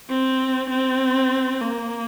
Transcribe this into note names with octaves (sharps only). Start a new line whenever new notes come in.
C4
C4
A#3